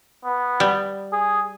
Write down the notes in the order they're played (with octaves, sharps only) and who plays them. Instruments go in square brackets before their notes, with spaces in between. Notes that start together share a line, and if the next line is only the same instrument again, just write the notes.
[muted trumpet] B3
[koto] G3
[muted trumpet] G#4